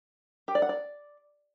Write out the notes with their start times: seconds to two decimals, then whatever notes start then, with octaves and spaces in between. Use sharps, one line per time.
0.48 G4
0.55 D5
0.62 F#5
0.69 D5